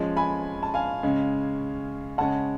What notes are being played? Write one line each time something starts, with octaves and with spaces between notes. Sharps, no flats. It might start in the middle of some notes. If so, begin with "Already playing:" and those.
Already playing: F3 G#3 C#4
G#5 B5
A5
F5 G#5
C#3 G#3 C#4
C#3 G#3 C#4 F#5 A5